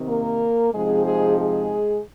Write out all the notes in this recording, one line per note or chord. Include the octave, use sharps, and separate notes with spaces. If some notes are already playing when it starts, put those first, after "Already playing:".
Already playing: C3 D#3 C4
A#3 A#4
C3 F3 G#3 C4 D#4 G#4
G#3 G#4
G#3 G#4